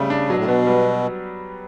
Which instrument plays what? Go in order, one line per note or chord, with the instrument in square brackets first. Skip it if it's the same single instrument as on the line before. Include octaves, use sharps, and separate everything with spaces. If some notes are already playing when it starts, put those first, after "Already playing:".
Already playing: [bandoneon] C#3 [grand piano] G3 A3
[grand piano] D4
[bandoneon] B2 [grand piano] F#3
[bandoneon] A2
[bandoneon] B2 [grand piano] B3
[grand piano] G3